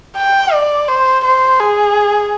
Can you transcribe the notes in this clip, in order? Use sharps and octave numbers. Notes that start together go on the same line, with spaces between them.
G5
D5
C5
C5
G#4